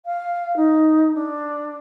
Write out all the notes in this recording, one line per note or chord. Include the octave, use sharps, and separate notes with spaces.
F5
D#4
D4